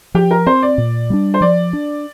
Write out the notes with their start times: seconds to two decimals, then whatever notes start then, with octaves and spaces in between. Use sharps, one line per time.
0.14 F3 G4
0.31 A#4
0.47 C4 C5
0.62 D5
0.78 A#2
1.10 G3 A#3 D4
1.34 C5
1.41 F3 D5
1.73 D4